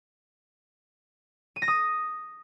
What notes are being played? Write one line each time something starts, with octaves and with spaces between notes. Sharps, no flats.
D#7
A#6
D#6